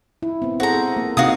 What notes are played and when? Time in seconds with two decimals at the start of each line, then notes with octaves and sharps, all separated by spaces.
0.22 E4
0.42 B3 C4
0.60 F#4 G#4 A4 C5 A#5
0.97 A#3
1.17 C3 C4 D#4 F#4 F5 D#6